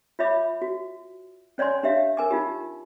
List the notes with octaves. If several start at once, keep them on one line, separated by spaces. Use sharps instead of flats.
F4 C#5 E5 B5 D6
F#4
C#4 C#5 D5 G#5 C6
D4 G4 C#5 E5 F5
A#4 G#5 D6
D#4 F4 G4